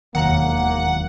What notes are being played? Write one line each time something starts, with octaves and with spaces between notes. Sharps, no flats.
E1 D#2 D#3 F#3 A#3 F#5 A#5